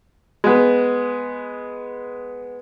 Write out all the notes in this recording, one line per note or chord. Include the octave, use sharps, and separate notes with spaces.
G#3 B3